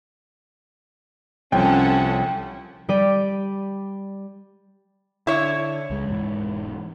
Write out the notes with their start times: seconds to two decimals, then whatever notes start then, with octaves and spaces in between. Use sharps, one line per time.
1.52 C2 F3 C#4 A4 F#5 G5
2.89 G3 G4 D5 D#7
5.27 D3 E4 C#5
5.90 C#2 G#3
6.08 E1 G#2